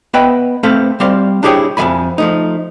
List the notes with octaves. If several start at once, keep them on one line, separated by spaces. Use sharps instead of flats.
B3 B4 D#5 E5 G5 B5
A3 C4 A4 B4 E5 F5
G3 C4 C5 D5 F5 C6
D4 E4 G4 G#4 C#5 G5
F2 F3 G3 E5 G#5 B5
F3 A3 D#4